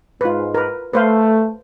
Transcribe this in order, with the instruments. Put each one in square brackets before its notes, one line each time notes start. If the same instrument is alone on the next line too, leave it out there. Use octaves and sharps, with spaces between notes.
[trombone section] G#2 [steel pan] F4 B4
[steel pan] A#4 B4
[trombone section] A3 [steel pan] B4 C5 F5